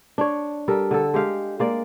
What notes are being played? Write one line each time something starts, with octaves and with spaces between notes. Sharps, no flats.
D4 C#5
G3 A4 A#4
D3 A4
G#3 G4 F5
G#3 A#3 D5